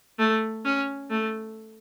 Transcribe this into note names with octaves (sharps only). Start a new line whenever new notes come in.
A3
C#4
A3